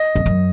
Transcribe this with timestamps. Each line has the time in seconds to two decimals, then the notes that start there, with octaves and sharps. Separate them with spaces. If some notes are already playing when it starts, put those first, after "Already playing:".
Already playing: D#5
0.16 F2
0.26 F#2